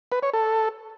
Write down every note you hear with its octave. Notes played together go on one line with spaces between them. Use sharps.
B4
C#5
A4